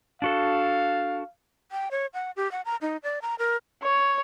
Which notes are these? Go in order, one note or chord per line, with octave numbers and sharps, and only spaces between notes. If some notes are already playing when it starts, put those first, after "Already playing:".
D4 F#4 A4 F5
G5
C#5
F#5
G4
F#5
A#5
D#4
D5
A#5
A#4
C#5